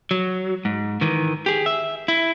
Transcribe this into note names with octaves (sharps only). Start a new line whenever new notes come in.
F#3
G#2
D#3 E3
G4 G#4
E5
E4